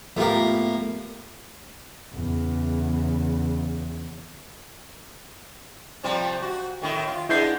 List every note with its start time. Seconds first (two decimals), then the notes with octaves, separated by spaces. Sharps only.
0.17 A2 A#3 B3 F4 G4
2.14 E2 C#3
6.04 C3 F3 G3
6.42 F#4
6.82 A2 D#3 E4
7.07 F4
7.29 G#3 B3 D4 E4 G6 C7